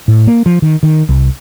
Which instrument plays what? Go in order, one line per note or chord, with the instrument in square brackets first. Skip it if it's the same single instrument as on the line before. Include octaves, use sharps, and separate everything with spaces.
[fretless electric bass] A2
A#3
F3
D#3
D#3
C2